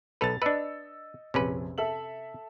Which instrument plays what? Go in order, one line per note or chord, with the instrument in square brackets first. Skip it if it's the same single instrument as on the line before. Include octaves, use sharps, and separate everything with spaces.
[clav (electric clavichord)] B1 A4 B4 [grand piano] A6 F7
[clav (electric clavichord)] D4 B4 [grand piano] D#5 E6 C#7
[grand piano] A#1 F2 [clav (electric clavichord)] C3 C#4 B4
[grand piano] A4 E5 F#7